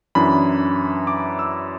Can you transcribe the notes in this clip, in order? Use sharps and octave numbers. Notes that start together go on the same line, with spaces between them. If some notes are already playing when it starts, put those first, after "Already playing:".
F#2 E3 D4 B5
D6
E6